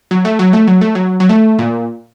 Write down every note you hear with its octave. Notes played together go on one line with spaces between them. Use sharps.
F#3
A3
F#3
A3
F#3
A3
F#3
F#3
A3
A#2